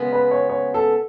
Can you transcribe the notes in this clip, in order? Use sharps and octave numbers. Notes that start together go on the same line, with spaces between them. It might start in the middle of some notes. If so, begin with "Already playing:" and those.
Already playing: C#3 G#3 B3
B4
C#5
C#5
A4